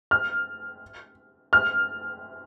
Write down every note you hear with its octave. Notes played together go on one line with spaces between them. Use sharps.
F6
F6